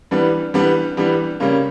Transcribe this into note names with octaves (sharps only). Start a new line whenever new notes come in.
E3 G3 B3 D4
E3 G3 B3 D4
E3 G3 B3 D4
C#3 G3 A#3 C#4